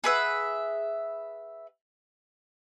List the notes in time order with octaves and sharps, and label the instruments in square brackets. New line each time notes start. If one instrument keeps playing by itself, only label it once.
[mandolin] G#4 B4 E5 F#5